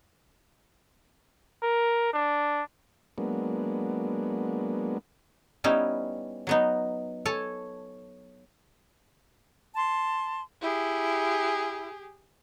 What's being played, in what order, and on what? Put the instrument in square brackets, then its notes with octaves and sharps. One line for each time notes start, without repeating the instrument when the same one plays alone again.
[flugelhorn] A#4
D4
[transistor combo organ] F#3 G#3 A#3 B3 D4
[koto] G3 B3 C#4 D#4 E4
F#3 B3 D#4
A4 C#5 G#5 A5
[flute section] A5 C6
[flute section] E4 [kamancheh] G4 G#4